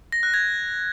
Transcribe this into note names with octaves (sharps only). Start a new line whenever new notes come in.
A#6
F#6
G#6